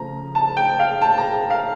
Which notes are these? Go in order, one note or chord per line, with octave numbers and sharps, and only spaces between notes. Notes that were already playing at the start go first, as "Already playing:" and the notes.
Already playing: C#3 F3 A3 A#5
A5
G5
F5
A5
A#5
F5